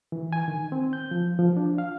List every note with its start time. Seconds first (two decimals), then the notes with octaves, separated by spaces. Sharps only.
0.12 E3
0.33 G#5
0.48 D#3
0.72 C4
0.93 G6
1.11 F3
1.39 F3
1.57 D4
1.78 F5